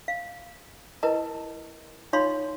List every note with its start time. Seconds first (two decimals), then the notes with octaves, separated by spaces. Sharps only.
0.08 F5
1.03 E4 A#4 B4 D#5 A5
2.13 D#4 F4 C#5 F5 B5 C6